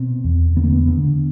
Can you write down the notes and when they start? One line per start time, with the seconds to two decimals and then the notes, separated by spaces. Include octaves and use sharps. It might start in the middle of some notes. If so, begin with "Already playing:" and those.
Already playing: B2 C4
0.24 E2
0.56 D3 B3
0.63 A#3
0.72 B3
0.88 D3